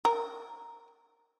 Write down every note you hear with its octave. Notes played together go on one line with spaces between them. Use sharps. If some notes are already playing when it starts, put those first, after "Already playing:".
A#4